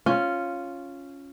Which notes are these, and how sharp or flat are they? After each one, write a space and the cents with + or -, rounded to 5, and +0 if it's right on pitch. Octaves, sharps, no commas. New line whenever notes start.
C#4 +0 F4 +0